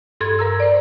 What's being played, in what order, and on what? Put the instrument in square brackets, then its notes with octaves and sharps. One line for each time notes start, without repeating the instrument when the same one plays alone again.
[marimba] G2 A4 C6 G#6
A#4 A#5 E6
C5 D5